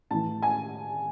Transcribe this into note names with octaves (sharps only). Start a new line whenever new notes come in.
A2 E3 A5
G#5